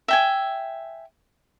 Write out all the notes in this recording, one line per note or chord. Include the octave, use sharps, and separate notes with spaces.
E5 G5 G#5